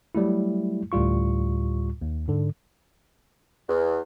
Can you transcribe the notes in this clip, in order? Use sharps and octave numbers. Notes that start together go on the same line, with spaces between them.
F#3 G3 A3 E4
D2 A2 G3 F4 C#6
D#2
G#2 D3
E2